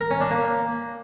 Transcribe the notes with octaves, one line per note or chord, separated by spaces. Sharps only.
A#4
C#4
D4
A#3